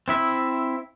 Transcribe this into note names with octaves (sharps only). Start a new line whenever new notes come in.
C4 E4 E5